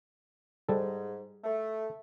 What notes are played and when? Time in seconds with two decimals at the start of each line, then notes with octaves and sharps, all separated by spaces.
0.69 G#2 G3 A4
1.44 A3